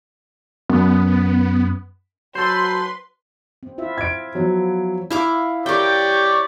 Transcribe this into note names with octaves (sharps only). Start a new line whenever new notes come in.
F#2 B3
F#3 A4 B4 C5 C6
C4
E4 F4 E5
F4 G#6 D7
F3 F#3 B3
E4 F5 D6
G4 A#4 C#5 D5 G5